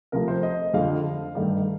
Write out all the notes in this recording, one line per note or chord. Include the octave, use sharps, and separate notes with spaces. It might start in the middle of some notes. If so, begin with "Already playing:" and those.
C3 F3 A3 A#4
C5
D#5
F2 D3 F3 F5
G2 D#3 A3